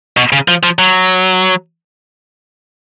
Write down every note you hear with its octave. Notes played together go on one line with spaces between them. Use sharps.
B2
C#3
F3
F3
F#3